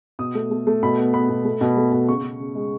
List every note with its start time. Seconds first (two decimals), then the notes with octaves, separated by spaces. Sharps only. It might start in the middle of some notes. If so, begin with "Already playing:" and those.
0.19 B2 D#6
0.35 A3
0.51 A3
0.67 A3
0.83 B2 B5
0.98 B3
1.13 B3 B5
1.29 B2
1.45 A3
1.61 B2
1.77 A3
1.92 B2
2.08 C#3 C#6
2.23 C#3
2.39 C#3
2.55 G#3